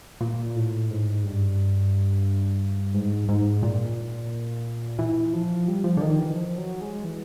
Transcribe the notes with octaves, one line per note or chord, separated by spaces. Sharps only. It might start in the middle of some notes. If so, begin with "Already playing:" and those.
A#2
A2
G#2
G2
G#2
G#2
A#2
E3
F3
G3
F3
D3
D#3
E3
F3
F#3
G#3
E3